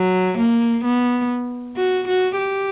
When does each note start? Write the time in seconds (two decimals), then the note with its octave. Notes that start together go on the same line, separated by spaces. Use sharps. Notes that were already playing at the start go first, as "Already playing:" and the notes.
Already playing: F#3
0.38 A#3
0.84 B3
1.77 F#4
2.07 F#4
2.38 G4